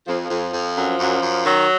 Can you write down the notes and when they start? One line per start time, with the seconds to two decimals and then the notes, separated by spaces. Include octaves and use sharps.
0.07 F2 F3
0.24 F3
0.29 F2
0.52 F2
0.75 F#2
0.99 F#2
1.21 F#2
1.44 D#3 F#3